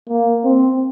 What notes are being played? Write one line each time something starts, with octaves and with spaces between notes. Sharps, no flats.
A#3
C4